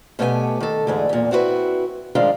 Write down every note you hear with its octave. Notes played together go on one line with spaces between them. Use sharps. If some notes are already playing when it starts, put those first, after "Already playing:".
B2 A3 B3 G4 E5 G#5
D#3 A4
D2 G#2 E3 G#4
E2 A#2
C4 E4 F#4 G4 B4
A2 D#3 F3 G#3 D4 F5